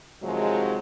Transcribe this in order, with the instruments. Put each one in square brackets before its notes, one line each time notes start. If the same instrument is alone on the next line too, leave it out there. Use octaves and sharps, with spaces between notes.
[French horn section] C3 D#3 F3 F#3 G#3